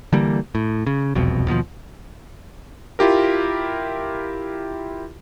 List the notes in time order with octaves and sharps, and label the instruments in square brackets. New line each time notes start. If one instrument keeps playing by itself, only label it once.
[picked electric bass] D3 E3 G3 A#3
A2
C#3
E1 C2 F2 B2
D#2 B2 E3 F3
[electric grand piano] E4 F4 G4 A#4